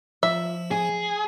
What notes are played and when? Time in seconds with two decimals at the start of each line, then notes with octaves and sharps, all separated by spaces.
0.23 F3 F4 E5
0.71 G#4 G#5